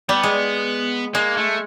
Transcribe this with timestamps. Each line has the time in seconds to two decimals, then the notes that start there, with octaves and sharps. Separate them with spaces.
0.09 G3 B3
0.23 G#3
1.14 G#3 A#3
1.37 A3